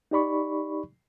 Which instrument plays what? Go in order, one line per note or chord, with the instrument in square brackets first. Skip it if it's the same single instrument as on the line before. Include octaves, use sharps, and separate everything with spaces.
[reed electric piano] D#4 G4 D5 B5 C#6